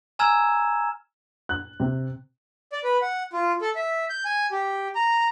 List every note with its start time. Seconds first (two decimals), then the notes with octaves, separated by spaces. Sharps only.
0.19 G#5 A#5 E6 F6 G#6 E7
1.49 F#6
1.80 C3
2.72 D5
2.84 B4
3.02 F#5
3.33 F4
3.61 A4
3.75 E5
4.10 G6
4.25 G#5
4.52 G4
4.95 A#5